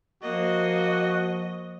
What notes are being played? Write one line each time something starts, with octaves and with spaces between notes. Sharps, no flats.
F3 A#3 F#4 D#5